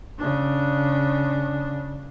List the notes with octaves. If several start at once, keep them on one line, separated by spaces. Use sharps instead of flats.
C#3 D4